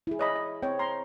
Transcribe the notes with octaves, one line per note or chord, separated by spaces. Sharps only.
E4 G#4
C#5 D#5 B5
D#5
C4 C#5 G5
A#5 C6